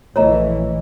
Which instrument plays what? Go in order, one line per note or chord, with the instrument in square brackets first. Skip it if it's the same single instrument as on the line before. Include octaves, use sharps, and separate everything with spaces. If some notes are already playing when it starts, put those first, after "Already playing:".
[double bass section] A#1 E3 [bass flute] A3 [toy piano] C#5 A#5 [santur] D#5 E5 D#6